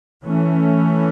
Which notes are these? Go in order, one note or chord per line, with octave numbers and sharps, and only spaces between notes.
E3 A3 C#4